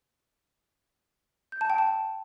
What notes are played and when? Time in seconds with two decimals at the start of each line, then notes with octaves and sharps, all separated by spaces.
1.52 G6
1.61 A5
1.70 G5
1.78 A5
1.87 G5